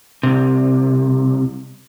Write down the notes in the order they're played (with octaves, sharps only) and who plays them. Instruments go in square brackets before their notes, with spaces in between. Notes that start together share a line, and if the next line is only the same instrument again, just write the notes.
[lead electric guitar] C2 C3